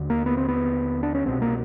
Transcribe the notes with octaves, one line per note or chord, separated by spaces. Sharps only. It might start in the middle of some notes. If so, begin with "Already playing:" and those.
Already playing: D#2 D3
A#3
B3
C4
B3
D4
C#4
C2 B2 C4
A#3